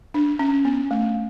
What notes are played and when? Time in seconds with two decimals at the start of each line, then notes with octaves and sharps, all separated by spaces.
0.14 D4
0.39 C#4
0.65 B3
0.91 A3